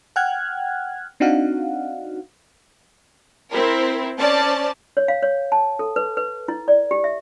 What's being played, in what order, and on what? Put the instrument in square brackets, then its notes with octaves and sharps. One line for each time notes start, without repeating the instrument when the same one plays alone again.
[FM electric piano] F#5 G5 F6 F#6 G#6
C4 D4 D#4 F#4 F5 F#5
[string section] C4 E4 A#4
C#4 C5 D5 A5
[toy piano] C#5
F5
C#5
A5
A4
B4
B4
E4
D5
G4
E5